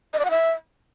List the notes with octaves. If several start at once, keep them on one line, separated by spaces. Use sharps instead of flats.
D#5
D5
F#5
E5